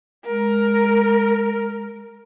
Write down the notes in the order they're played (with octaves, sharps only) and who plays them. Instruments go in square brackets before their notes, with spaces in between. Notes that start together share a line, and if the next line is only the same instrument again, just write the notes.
[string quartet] G#3 A#4